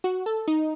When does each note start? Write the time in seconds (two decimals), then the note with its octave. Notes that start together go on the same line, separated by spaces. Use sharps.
0.04 F#4
0.26 A4
0.48 D#4